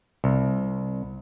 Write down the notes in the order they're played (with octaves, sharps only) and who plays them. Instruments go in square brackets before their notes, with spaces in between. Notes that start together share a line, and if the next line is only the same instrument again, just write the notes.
[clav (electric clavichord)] C2